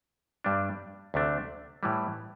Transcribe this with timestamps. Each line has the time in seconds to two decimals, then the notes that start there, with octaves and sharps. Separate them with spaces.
0.44 G2 G3 D4
1.14 D2 C3 A3 D4
1.83 A2 E3 G3